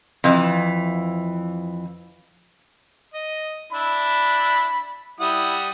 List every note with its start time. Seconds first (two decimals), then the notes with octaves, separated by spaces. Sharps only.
0.24 F2 E3
3.14 D#5
3.72 D4 E4 B5
5.20 G3 E4 F#5 D#6